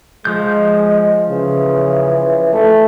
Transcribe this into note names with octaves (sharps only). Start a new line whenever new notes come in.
F3 G#3 G6
C#3 E3
A3